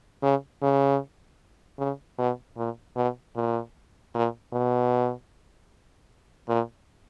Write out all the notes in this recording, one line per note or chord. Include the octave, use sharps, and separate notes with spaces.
C#3
C#3
C#3
B2
A#2
B2
A#2
A#2
B2
A#2